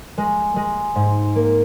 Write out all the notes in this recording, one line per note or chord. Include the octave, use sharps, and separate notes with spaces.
G#3
G#3
G#2
A#3